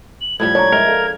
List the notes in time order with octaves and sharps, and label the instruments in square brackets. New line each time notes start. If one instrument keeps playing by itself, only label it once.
[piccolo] F#7
[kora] A2 F3 G3 [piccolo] G#6
[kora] D4 [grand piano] C#5 A#5
[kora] G#3 [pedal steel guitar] A#4 [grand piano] D5 E5
[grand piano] A4 F5